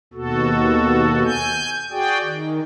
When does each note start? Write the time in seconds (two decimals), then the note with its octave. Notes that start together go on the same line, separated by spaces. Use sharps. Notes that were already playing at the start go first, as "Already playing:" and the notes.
0.14 D#2 B2 F#4 A4
1.25 G#5 G6
1.91 F#4 G#4 D5 G5
2.22 D#3